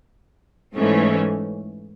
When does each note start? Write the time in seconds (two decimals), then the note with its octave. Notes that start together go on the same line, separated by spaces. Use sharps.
0.75 G#2 E3 A3 C#4